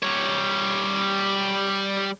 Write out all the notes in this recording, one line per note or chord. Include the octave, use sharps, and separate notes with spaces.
G3 C#5